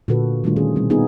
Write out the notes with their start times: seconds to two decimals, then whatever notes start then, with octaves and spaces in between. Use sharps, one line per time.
0.08 A#2 D3 A#3 F#4 A4 B4
0.44 D#3 G3 A3 D4 F4
0.56 D#3 C#4 G#4
0.76 B2 G3 C4
0.90 B3 D#4 F4 G#4